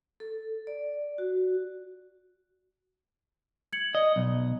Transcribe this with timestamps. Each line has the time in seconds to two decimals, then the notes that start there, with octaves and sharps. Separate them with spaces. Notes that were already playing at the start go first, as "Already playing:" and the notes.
0.20 A4
0.67 D5
1.18 F#4
3.73 G#6 C#7 F#7
3.95 D5 D#5
4.16 B1